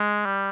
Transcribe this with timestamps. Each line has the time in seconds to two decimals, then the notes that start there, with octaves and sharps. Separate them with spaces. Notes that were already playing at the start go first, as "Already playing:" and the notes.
Already playing: G#3
0.26 G3